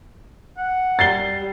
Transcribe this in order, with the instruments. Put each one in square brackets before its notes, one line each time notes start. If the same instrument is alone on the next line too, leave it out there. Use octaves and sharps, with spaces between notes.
[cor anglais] F#5
[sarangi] G3 [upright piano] A6 C7 G7